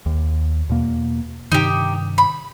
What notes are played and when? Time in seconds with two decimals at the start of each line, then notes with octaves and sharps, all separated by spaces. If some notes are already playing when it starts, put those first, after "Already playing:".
0.06 D#2
0.69 E2 B2 A#3
1.52 G2 C3 D#3 D#4 G4
2.18 B5